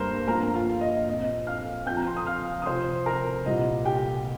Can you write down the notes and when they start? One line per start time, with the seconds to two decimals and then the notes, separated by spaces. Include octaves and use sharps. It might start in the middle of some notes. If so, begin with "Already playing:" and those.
Already playing: G2 G3 A#3 A#4 C5 A#5
0.27 G2 F3 A#3 A#4 A#5
0.54 F4 F5
0.81 D#5
1.07 A#2 F3 C4 D#5
1.47 F5 F6
1.86 F2 F3 C4 G5 G6
1.97 A#5
2.07 C6
2.17 D#6
2.26 F5 F6
2.62 D#6
2.66 F2 C3 F3 C4 C5 C6
3.06 A#4 A#5
3.46 C2 A#2 G3 D#5
3.85 G4 G5